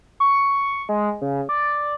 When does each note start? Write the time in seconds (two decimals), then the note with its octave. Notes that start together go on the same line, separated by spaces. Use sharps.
0.20 C#6
0.89 G#3
1.22 C#3
1.49 D5